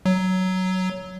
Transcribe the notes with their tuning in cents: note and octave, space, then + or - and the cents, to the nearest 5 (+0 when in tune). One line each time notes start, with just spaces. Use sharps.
F#3 +10